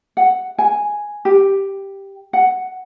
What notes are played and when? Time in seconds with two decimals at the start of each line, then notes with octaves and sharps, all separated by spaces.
0.17 F#5
0.59 G#5
1.25 G4
2.33 F#5